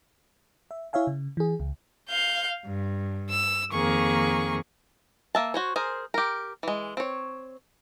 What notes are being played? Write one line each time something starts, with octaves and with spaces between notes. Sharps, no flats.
E5
E4 C#5 E5 F5 G#5
C#3
E3 G#4
C#2
F5 G6
G2
E6
F2 D#3 A#3 G#4 C#6
A#3 E5 A5
F#4 C5 C#5
G#4 A#4 C5
G4 A#4
E3 G#3
C4 C#5